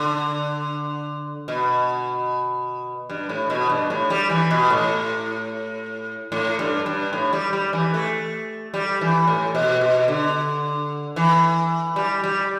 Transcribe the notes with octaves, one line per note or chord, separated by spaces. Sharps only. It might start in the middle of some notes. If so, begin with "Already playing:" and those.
Already playing: D3
B2
G2
A2
B2
G2
A2
G3
E3
B2
A2
A2
G2
G2
A2
G3
G3
E3
A3
G3
E3
A2
B2
B2
D3
E3
G3
G3